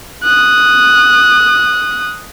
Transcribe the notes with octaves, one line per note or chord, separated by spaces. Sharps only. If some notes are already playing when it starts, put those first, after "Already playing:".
D#6 F#6